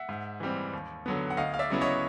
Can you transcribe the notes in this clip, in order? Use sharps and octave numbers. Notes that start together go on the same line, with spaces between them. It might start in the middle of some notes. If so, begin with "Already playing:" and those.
Already playing: E5 F#5
G#2
E3 G3 C4
D#2
D3 F#3 B3
F#5
D2 D#5 F5
F5
D5 E5
C#3 F#3 B3 E4
C#5 D#5